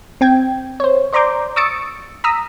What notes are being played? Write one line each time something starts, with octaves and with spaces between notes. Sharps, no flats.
C4 G5 G#6
C5 C#5
C5 D5 A#5 C6 D6 G6
C#6 D#6 E6 A6 C#7 D7
A#5 D#6 E6 B6